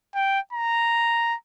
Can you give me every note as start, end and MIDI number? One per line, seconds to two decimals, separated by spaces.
0.15 0.39 79
0.53 1.35 82